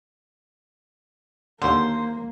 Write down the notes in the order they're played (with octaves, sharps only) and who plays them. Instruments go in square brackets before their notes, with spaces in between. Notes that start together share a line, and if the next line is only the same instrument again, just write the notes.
[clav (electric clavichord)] D#2 D3 [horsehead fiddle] A#3 [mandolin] C5